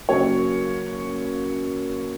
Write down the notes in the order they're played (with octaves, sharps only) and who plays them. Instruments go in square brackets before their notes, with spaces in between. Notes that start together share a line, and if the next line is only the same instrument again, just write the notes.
[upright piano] C#3 F#3 A#3 C#5